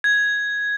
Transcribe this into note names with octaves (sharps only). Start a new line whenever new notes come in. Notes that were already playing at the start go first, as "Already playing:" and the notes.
G#6